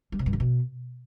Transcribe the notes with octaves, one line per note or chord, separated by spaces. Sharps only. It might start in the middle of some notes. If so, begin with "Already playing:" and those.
G3
C3
G2
D3
B2